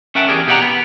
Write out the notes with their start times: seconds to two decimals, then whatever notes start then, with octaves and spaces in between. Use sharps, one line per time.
0.15 C#4 A#4 E5 F#5 G5 A5
0.28 E2 G4 G#4 A#4 D5
0.47 B2 G4 D5 F#5 G5 A#5
0.62 B3